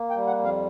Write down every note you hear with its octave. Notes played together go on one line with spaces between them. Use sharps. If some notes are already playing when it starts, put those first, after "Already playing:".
Already playing: A#3
G5
G3
F#5
F2
F5